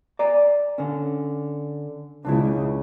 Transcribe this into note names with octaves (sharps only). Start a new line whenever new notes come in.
D5 G#5 A#5
D3 C#4
C#2 C#3 D4 E4